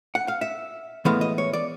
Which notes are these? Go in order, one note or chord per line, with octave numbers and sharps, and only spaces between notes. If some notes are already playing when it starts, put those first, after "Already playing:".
F#5
F5
E5
A2 E3 G#3 B3 F5
D#5
C#5
D5